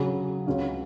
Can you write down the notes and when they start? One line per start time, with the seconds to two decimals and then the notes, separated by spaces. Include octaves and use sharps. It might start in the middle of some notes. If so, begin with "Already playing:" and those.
Already playing: C#3 F#3 C#4 G#4
0.47 C#2 C#3 G#3 C#4 F#4